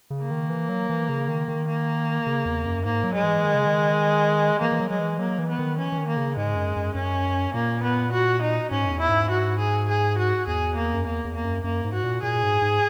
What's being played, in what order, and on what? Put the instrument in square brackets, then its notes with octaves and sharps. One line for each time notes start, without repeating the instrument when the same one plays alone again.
[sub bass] C#3
[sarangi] A#3
[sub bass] D#3
E3
F#3
E3
C#3
D#3
D#3
[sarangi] A#3
[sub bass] C#3
E2
F#2
[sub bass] G#2 [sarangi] A#3
[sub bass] F#3
[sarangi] G#3
[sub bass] E3
D#3
C#3
D#3
[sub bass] E3 [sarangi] A#3
[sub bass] E3
F#3
[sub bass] F#3 [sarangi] G#3
[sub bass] E3
[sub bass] F#3 [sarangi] A#3
[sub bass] E3
[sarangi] B3
[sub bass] D#3
[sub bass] E3 [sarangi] C#4
[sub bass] E3
D#3
[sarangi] A#3
[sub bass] C#3
[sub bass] G#2 [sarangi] G#3
[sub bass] F#2
F#2
[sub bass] F#2 [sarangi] C#4
[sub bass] A#2 [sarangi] A#3
[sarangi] B3
F#4
D#4
[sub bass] G#2 [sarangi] C#4
[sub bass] F#2
E2
[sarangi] E4
[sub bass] G#2
[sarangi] F#4
G#4
G#4
F#4
[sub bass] E2 [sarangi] G#4
[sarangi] A#3
[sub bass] F#2
[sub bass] E2 [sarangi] A#3
[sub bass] E2
[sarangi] A#3
[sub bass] F#2
[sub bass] F#2 [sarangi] A#3
[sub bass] G#2
[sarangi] F#4
[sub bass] A#2
[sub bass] A#2 [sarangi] G#4
[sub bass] G#2
G#2